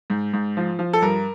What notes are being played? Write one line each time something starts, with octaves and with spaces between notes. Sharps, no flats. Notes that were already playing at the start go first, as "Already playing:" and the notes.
G#2
G#2
F3
F3
A4
G2 A#4